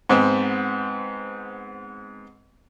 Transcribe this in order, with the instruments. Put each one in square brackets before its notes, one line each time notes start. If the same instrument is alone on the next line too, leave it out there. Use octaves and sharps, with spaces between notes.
[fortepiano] G#2 B3 C4